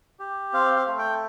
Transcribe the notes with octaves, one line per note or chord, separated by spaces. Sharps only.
G4
C4 F5
F5
A3
G5